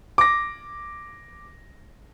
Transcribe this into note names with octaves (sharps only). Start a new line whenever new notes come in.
D6 A#6